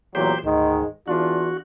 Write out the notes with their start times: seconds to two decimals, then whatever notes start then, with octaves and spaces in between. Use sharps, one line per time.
0.15 E2 A#2 F#3 G4 C5
0.44 D2 G#2 D#3 G#3
1.08 E2 D4 F4 F#4